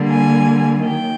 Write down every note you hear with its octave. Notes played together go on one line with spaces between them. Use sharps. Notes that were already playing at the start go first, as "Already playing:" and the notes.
Already playing: D3 G3 A#3
G#5
D#3 F#3 A#3 G5